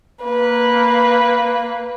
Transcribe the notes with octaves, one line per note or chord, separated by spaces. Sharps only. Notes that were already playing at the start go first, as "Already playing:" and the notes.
A#3 B4